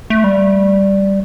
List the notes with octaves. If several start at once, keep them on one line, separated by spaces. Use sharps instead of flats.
A3
G3